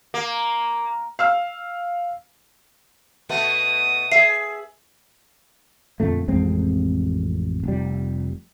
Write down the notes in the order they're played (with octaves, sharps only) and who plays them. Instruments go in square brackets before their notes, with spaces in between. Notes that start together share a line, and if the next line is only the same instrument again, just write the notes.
[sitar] A#3
[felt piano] F5 E6 F6
[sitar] B2 A3 B3 [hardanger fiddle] D#6
[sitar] G#4 E5 [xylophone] C7
[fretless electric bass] F2 A#2 D3 A3
A1 F2 G#3 C4
F1 G3